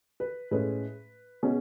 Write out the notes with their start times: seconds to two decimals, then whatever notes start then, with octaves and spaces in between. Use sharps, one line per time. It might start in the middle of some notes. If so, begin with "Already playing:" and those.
0.20 B4
0.51 A2 G#3 C#4 B4
1.43 B2 G#3 C#4